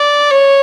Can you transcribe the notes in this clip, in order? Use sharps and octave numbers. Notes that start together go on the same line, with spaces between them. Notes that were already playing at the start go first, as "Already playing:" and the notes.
Already playing: D5
C#5